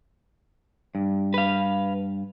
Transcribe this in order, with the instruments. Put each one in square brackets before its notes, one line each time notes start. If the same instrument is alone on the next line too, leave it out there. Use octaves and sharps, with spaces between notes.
[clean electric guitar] G2
[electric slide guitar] B4 F5